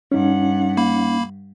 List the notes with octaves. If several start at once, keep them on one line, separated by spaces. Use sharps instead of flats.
G2 C#4 D#4 F#5
A#3 B5